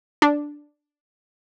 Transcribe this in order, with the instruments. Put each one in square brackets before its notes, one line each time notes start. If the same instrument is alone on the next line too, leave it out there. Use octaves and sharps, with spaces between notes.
[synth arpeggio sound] D4